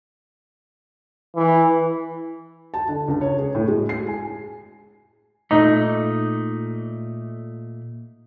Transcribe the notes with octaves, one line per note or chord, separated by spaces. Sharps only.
E3
A5
D3
C#2
C#5
G#4
A2
G#3
C7
G#5
A#2 A3 D#4